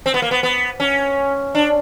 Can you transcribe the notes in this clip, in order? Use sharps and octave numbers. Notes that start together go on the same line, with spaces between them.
C4
B3
A#3
B3
B3
C#4
D4